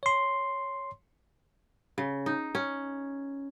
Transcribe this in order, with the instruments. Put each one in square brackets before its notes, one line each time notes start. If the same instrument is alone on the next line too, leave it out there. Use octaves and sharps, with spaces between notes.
[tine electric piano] C#5 C6
[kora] C#3
D#4
C#4